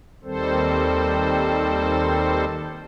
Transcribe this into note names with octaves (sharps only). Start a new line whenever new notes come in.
D#2 D#3 G3 C4 A4 C5